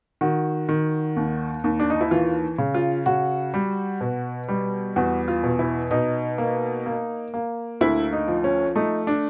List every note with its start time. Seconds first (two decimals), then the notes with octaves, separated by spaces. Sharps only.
0.21 D#3 F#4
0.69 D#3
1.16 D#2
1.64 D#2
1.80 D4
1.90 D#4
2.01 E4
2.11 E3 F4
2.58 C#3
2.74 F4
3.06 C#3 F#4
3.54 G3
4.01 B2
4.49 G3
4.96 E2 F#4
5.28 F4
5.44 B2
5.59 E4
5.91 B2 D#4
6.38 A#3
6.86 A#3
7.34 A#3
7.81 D2 E4
8.13 D#4
8.28 F3
8.44 C#4
8.76 A3 D#4
9.07 D4